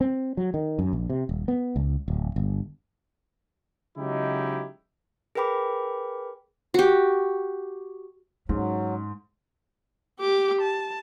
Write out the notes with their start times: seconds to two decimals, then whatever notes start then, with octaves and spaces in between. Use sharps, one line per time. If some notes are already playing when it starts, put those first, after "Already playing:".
0.01 C4
0.37 F#3
0.54 D#3
0.79 F#2
0.93 A#1
1.10 C3
1.29 D#1
1.48 B3
1.76 C#2
2.08 D1
2.36 G1
3.97 C#3 F#3 G#3 D#4 E4 G4
5.35 G#4 A#4 B4 G5 B5 D6
6.74 F#4 G4
8.49 G#2 F#3 C#4
10.20 G4 D6
10.61 A5